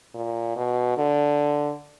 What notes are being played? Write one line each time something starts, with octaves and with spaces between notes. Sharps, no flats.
A#2
B2
D3